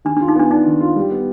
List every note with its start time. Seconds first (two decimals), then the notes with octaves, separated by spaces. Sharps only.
0.05 D#3 D4
0.17 D4 F4
0.28 D#4
0.36 B3 D4
0.51 D4 D#4
0.66 D#3
0.81 F4
0.96 G3
1.11 B3